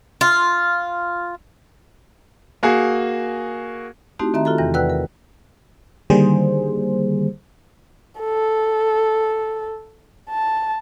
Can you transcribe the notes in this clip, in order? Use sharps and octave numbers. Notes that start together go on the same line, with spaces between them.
F4
A#3 F#4 G#4
A3 C4 D#4 E4 F#4 G4
D#3 C4 E5 A#5
F4 F#4 A4 A#5
E2 C3 E3 A#6
B4 D5 F#5 G5 E6 F#6
A#4
D3 D#3 G3 A#3 G#4 C5
A4
A5